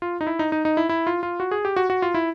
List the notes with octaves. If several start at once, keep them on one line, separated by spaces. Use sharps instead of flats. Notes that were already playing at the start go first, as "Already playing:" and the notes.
F4
D#4
E4
D#4
D#4
D#4
E4
E4
F4
F4
F#4
G#4
G4
F#4
F#4
F4
E4